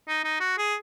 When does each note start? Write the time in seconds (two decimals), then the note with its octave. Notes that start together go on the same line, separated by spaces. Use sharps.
0.08 D#4
0.24 D#4
0.40 F#4
0.58 G#4